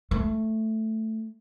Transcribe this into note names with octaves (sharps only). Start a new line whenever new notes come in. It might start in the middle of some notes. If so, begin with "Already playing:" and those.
A3